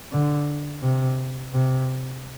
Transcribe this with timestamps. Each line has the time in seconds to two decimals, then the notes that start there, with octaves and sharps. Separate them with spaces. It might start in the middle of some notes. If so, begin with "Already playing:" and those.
0.12 D3
0.83 C3
1.53 C3